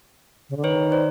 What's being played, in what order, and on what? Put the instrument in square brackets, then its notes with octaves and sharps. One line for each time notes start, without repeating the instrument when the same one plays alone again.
[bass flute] C#3
D3
[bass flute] D#3 [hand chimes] B4 C#5
[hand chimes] C5 D5